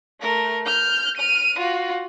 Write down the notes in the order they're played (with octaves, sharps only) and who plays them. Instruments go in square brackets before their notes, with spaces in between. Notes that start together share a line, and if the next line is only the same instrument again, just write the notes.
[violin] A3 A#4
F6 G6
F6 D#7
F4 F#4